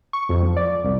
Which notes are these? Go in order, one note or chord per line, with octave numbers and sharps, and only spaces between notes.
C#6
F2
F3
D5
C2